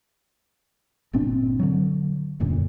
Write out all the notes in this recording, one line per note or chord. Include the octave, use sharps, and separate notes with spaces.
G1 A#2 C4 D4
D3 F#3
D#1 F#2 A#2 D3